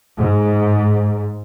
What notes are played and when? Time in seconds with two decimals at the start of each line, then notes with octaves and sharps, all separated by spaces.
0.17 G#2